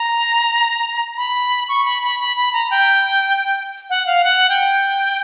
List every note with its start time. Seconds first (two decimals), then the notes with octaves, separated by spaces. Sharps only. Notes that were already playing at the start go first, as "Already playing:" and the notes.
Already playing: A#5
1.17 B5
1.69 C#6
1.85 B5
2.02 B5
2.20 B5
2.37 B5
2.53 A#5
2.71 G5
3.90 F#5
4.07 F5
4.24 F#5
4.50 G5